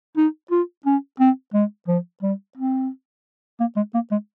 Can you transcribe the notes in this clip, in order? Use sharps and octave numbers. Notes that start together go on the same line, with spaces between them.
D#4
F4
C#4
C4
G#3
F3
G3
C4
A#3
G#3
A#3
G#3